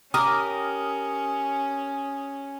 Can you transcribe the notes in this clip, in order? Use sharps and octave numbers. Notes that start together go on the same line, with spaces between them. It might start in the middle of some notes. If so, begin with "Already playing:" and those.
C#4 G4 A#4 D#6